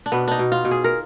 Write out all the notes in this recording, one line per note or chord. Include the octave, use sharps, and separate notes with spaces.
D4
B2 B3
D4 D#4
B2
F4
B2
G#4
A#4